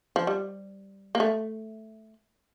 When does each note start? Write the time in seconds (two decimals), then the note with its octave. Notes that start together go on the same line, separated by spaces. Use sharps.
0.16 F3
0.27 G3
1.15 A#3
1.20 A3